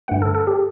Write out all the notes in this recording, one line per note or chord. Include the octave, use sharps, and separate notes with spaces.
G2 D3 A3 F#5
A4
A4
G4